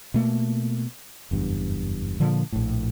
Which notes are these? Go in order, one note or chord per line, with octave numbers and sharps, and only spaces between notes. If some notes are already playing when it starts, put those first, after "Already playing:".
B2 A3 A#3
F#1 E2 G2
A#2 D3 F3 A#3
A#1 A2